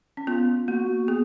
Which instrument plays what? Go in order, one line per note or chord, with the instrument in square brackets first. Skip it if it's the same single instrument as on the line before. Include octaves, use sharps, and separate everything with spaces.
[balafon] C#4
[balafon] B3 [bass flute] F4
[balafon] A#3 [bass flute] F#4
[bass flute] F#4
[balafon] B3 [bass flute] G#4